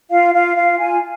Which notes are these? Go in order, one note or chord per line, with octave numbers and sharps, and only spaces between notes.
F4 F5
F4 F5
F4 F5
F4 G#5